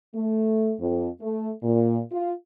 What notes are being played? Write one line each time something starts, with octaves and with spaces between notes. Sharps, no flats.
A3
F2
A3
A#2
F4